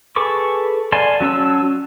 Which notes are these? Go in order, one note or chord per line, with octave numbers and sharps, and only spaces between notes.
G#4 A4 B4 C#6 D6
D5 F5 G#5 A5 C6
F#3 C#4 A5 E6